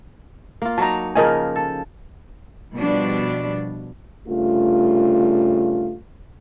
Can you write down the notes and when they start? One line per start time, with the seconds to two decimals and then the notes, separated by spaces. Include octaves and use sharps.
0.62 A#3 F4
0.78 F#3 D#4 A5 A#5
1.16 C#3 F3 A#3 A#4 D#5 G#5
1.56 A4
2.75 B2 F3 G3 D4
4.27 G2 C#3 A3 F4